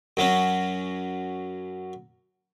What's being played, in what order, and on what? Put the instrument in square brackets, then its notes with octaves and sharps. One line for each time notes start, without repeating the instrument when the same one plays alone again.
[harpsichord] F#2 F#3 C#4